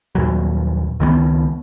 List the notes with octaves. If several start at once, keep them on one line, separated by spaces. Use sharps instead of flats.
A#1 D#2 A#2 F#3
C#2 D#3 G#3 B3